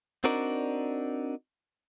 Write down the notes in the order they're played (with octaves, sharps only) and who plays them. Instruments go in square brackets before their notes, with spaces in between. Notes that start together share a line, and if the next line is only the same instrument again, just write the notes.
[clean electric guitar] C4 D4 D#4 F#4 A#4 D5